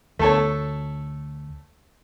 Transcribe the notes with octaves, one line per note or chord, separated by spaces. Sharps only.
D2 A3 D4 A4 C#5